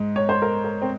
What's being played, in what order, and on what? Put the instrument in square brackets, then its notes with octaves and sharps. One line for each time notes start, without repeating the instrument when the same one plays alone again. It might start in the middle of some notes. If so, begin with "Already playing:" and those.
Already playing: [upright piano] G#2 G#3
[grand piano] C#5
C5
A#4
A#4
C4